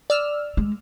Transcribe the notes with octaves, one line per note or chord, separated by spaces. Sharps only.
D5 E6 F6
G#3